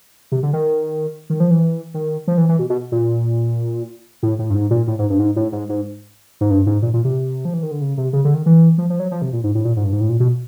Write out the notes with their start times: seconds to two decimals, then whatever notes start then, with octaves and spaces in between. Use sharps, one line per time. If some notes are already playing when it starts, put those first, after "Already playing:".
0.32 C3
0.43 D3
0.53 D#3
1.30 D#3
1.40 F3
1.51 E3
1.94 D#3
2.27 F3
2.38 E3
2.49 E3
2.59 B2
2.70 B2
2.92 A#2
4.23 A2
4.39 A2
4.50 G2
4.55 G#2
4.71 A#2
4.87 A2
4.99 G#2
5.10 G2
5.19 G#2
5.36 A2
5.52 G#2
5.69 G#2
6.41 G#2
6.50 G2
6.66 G#2
6.82 A#2
6.94 A#2
7.05 C3
7.45 F3
7.54 E3
7.63 D#3
7.71 D3
7.81 C#3
7.97 C3
8.13 C#3
8.25 D3
8.34 D#3
8.46 E3
8.78 F3
8.90 F3
9.00 F#3
9.11 F3
9.22 C3
9.33 A#2
9.44 G#2
9.55 A2
9.65 A#2
9.76 G#2
9.84 G2
9.93 G#2
10.01 A2
10.09 A#2
10.20 B2